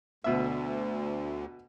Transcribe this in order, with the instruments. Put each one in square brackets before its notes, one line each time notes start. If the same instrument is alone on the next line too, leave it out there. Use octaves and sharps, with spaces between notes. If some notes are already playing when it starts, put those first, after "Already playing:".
[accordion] D2 [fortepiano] B2 E5